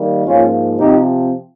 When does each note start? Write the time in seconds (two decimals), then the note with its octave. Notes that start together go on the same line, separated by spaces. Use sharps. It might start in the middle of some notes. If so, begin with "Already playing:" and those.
Already playing: D#3 G3 A#3
0.26 G#2 F3 A#3 C#4 F4
0.79 C3 F3 C4 D#4 G4